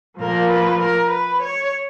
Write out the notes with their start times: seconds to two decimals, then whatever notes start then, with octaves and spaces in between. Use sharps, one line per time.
0.19 A#2 F3 A#3 A#4
0.50 B4
0.81 A#4
1.10 B4
1.42 C#5